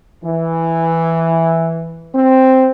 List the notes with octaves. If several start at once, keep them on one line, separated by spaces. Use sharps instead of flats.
E3
C4